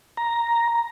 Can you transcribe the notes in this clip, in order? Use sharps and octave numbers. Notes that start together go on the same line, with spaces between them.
A#5